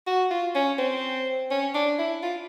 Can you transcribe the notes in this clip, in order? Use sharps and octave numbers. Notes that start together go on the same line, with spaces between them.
F#4
F4
C#4
C4
C#4
D4
E4
F4